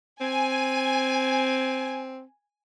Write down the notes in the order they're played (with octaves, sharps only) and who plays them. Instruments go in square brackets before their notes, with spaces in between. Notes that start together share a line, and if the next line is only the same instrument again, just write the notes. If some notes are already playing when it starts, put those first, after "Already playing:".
[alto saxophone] C4 [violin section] G#5